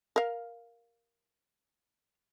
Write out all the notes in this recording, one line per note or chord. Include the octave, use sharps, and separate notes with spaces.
A#4 F5